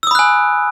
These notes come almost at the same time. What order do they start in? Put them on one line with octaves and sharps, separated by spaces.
E6 D#6 B5 F#6 G#5